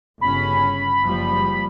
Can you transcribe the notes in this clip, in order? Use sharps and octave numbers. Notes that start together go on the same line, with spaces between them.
G1 C#3 C#4 B5
F#1 F3 G3